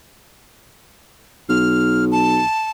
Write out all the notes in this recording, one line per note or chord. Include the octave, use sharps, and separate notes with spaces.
B1 F6
A5